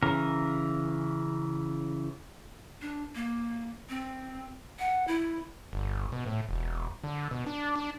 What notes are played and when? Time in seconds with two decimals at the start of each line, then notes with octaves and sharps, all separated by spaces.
0.03 C#3 E3 A#4
2.81 D4
3.15 A#3
3.89 C4
4.79 F#5
5.08 E4
5.73 G1
6.12 B2
6.26 A2
6.49 E1
7.04 D3
7.31 B2
7.46 D4
7.76 D4